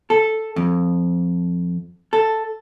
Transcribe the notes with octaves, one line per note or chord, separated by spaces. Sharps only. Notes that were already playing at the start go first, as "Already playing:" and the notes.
A4
F2
A4